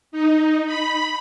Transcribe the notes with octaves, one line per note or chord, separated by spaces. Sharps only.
D#4
B5